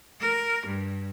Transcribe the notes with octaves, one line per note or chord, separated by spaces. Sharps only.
A#4
G2